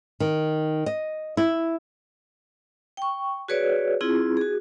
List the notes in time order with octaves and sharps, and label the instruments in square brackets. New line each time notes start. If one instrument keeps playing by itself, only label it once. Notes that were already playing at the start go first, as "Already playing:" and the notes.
[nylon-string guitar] D#3
D#5
E4
[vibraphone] G5 C#6
F#4 G#4 B4 C#5 D5
C4 E4 F4 G#4
F#4 G#4